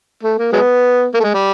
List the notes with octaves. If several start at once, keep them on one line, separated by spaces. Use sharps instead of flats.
A3
A#3
F#3 G#3 B3
A#3
A3
G#3
G3